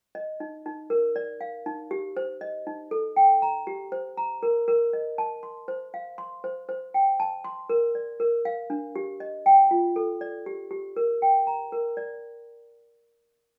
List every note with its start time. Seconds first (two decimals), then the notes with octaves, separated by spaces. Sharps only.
0.15 D#5
0.40 D#4
0.66 D#4
0.90 A#4
1.16 D5
1.41 F5
1.66 D#4
1.91 G4
2.17 C5
2.41 D#5
2.67 D#4
2.91 A4
3.16 G5
3.42 A#5
3.67 G4
3.92 C5
4.17 A#5
4.43 A#4
4.68 A#4
4.93 D#5
5.18 A5
5.43 C6
5.68 C5
5.94 F5
6.18 C6
6.44 C5
6.69 C5
6.94 G5
7.20 A5
7.44 C6
7.70 A#4
7.95 D5
8.20 A#4
8.45 F5
8.70 D4
8.96 G4
9.20 D#5
9.46 G5
9.71 F4
9.96 A4
10.21 D5
10.46 G4
10.71 G4
10.97 A#4
11.22 G5
11.47 A#5
11.72 A#4
11.97 D5